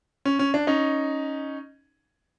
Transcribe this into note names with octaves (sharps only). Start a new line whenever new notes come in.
C#4
C#4
D4
C#4 D#4